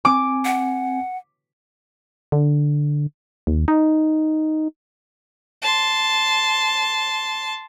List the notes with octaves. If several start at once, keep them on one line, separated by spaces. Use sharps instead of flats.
C4 G#5 D6
F#5
D3
D#2
D#4
A5 C6